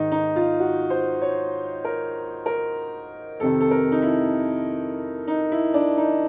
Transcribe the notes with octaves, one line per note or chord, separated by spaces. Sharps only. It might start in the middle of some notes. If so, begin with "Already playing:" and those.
Already playing: G#2 D#3 D#4
D#4
F4
F#4
C5
C#5
A#4
A#4
F2 C3 D#3 A4
A4
A#4
D#4
E4
D#4
E4
D4
D#4